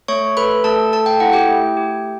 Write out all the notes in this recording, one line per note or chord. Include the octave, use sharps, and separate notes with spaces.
A3 C#5 C#6
A4 B4 B5
A3 A4 A5
A4 A5
G5
E4 F#5
G4 G5
A3
G4